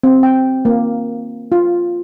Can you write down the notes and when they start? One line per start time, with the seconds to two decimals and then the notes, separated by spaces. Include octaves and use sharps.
0.04 C4
0.23 G5
0.65 A#3
1.52 F4